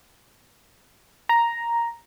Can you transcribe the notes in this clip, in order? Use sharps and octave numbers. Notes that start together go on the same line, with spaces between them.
A#5